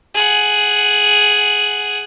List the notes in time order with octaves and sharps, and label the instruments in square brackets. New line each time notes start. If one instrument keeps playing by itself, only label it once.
[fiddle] G#4 F#5